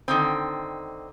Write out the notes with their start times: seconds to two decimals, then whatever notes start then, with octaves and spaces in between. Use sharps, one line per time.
0.08 D3 D#3 C4